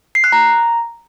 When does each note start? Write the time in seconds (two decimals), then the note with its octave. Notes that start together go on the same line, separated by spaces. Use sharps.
0.15 C7
0.24 F#6
0.32 A#5